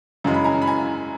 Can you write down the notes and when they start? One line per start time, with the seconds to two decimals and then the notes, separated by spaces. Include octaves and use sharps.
0.24 F#2 C#3 E3 G#3 A#5
0.34 B5
0.44 G#5 A#5
0.62 B5
0.67 G#5 A#5